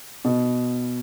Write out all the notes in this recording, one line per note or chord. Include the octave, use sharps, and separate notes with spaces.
B2